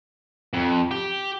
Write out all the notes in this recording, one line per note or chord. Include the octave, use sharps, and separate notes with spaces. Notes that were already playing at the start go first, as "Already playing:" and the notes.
F2
G4